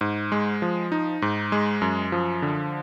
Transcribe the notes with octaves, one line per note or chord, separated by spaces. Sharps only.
G#2
G#3
F3
D#4
G#2
G#3
F#2
F3
D3